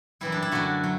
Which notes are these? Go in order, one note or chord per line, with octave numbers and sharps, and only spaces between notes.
F#2 E3 G3 E4
D4
E4
F#2 D3 F#3 A3 F#4
F#3